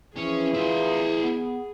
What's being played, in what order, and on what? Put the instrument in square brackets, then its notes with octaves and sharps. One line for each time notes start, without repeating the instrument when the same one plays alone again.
[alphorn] E3 [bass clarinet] F3 [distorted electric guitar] C#4 [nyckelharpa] G#4
[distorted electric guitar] E4 D#5 [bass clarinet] F4
[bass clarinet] B3